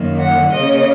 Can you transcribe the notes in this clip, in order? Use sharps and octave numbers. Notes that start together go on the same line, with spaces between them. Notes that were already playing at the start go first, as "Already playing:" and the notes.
Already playing: F#2 D#3 A#3
F#5
C#3 A#3 C#4 D#5